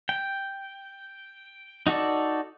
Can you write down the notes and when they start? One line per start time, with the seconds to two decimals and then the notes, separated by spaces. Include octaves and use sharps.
0.09 G5
1.87 D#4 F#4 A4 D5